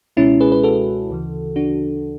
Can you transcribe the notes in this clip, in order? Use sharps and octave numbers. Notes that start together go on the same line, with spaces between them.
C#2 B2 G#3 C#4 E4
G#4 B4
B4
F#4 A4
D2 C#3 E3
D4 F#4